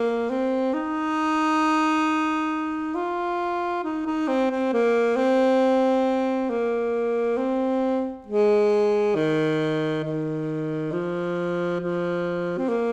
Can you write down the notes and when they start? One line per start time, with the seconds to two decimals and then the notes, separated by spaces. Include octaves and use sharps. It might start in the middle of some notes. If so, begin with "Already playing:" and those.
Already playing: A#3
0.30 C4
0.73 D#4
2.95 F4
3.84 D#4
4.06 D#4
4.28 C4
4.50 C4
4.73 A#3
5.16 C4
6.50 A#3
7.38 C4
8.27 G#3
9.15 D#3
10.04 D#3
10.92 F3
11.80 F3
12.58 C4
12.69 A#3